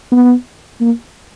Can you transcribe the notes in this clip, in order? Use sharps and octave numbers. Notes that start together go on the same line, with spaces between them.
B3
A#3